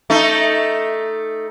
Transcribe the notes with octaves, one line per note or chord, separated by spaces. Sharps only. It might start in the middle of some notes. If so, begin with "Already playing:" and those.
A3 D#4